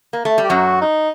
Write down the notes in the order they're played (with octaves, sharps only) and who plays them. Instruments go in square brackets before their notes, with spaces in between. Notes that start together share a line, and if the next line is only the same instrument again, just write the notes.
[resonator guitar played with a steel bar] A#3
A3
G3
[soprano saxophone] G4
[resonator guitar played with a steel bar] F#2 F#3 [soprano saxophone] F#4
[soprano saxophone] D#4